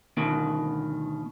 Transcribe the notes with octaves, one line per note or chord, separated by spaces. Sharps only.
D2 B2 D#3